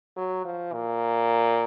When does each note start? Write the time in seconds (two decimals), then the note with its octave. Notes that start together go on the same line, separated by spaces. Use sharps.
0.17 F#3
0.45 F3
0.73 A#2